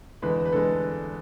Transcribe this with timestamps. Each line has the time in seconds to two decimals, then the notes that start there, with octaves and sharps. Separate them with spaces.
0.22 E2 D3 G#3 B4
0.45 B4
0.53 D3 G#3 A4